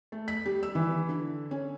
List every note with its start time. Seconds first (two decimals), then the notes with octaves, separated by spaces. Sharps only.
0.12 A3
0.28 B6
0.46 G3
0.63 E6
0.75 E3
1.09 D3
1.51 C#4